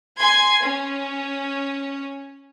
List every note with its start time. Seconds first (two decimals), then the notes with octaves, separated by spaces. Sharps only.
0.19 G#5 C6 G#6
0.62 C#4